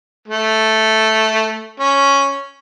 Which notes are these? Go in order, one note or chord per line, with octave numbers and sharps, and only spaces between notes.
A3
C#4